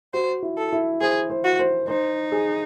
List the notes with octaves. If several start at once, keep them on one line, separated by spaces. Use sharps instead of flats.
F#4 C5
E4
A4
E4
G#4 C5
C5
F#4
C5
D#4 C5
G#4